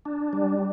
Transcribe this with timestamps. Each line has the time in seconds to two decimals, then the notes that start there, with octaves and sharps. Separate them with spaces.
0.05 D4
0.33 G3